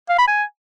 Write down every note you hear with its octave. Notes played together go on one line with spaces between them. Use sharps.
F5
B5
G#5